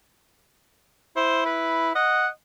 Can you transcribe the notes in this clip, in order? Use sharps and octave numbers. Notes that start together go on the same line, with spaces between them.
E4 C5
B4
D#5 F#5